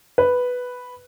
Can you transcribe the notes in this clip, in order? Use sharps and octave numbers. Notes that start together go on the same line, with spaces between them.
B4